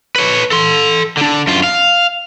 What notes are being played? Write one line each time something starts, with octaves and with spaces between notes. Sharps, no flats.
B4 C#5
A4 C6
D3 D4
F#2 F4
F5